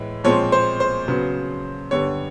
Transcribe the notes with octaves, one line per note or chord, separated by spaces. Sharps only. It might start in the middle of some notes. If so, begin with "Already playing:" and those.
Already playing: A2 E3 G#3
A#2 F3 G#3 C4 C#5
C5
C5
C#3 F#3 B3
G2 D3 G3 B3 C#5